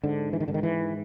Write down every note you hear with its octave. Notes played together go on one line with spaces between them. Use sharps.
G#2 D3
E3
D#3
G#2 D3
D#3
E3